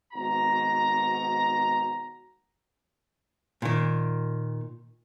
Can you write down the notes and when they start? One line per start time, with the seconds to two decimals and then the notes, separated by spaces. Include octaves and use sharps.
0.13 G#1 B2 B3 F#4 A#5
3.62 A#2 D#3